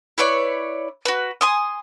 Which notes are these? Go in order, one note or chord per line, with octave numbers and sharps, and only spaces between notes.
E4 B4 C#5 D5
F#4 B4
G#5 C6 D#6